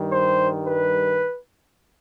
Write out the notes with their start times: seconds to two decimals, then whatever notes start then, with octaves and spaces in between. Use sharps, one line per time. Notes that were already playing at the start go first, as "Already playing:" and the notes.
Already playing: G2 D#3 G3
0.13 C5
0.65 B4